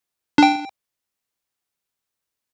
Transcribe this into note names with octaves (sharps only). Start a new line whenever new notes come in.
D4 G5